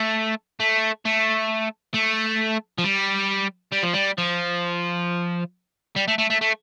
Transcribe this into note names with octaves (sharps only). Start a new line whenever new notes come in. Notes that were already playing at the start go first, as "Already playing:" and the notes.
Already playing: A3
A3
A3
A3
F3
G3
G3
F3
G3
F3
G3
A3
A3
A3
A3